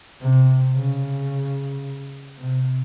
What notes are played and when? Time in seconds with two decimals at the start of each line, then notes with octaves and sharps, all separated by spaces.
0.21 C3
0.75 C#3
2.38 C3